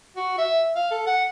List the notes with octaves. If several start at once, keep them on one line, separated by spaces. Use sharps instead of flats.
F#4
E5
F5
A4
F#5